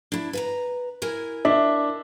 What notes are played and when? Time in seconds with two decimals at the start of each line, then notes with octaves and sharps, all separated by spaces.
0.12 D4 E4
0.33 B4 A5 A#5
1.02 E4 A#4 G#5
1.45 D4 E5